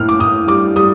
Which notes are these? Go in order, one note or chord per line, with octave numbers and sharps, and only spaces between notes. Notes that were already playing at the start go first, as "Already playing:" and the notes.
Already playing: A2 A#3 F6
D6
A2 D#6
G3 D6
G3 D#6